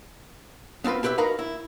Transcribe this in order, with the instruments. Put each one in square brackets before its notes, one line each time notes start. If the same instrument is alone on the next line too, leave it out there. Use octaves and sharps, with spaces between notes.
[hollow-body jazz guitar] B3 C4 F4 B4
E4 G4 B4 C5 E5
D#4 F#4 A#4 B4 F5
E4